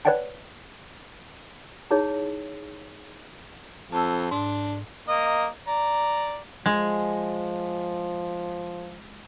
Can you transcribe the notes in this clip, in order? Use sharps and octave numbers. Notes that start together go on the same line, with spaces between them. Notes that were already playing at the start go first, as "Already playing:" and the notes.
B4 C#5 D5 F#5 G5 A5
D#4 E4 G#4 C#5
F2 A5 E6
G#2 D4
A#3 D#5
D5 A#5
F3 G#3